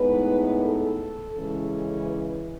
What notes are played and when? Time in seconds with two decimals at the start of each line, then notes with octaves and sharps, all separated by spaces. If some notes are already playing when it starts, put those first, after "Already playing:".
Already playing: A2 G#3 B3 D#4 B4
0.64 A4
1.36 C#3 E3 G#3 C#4
2.07 B4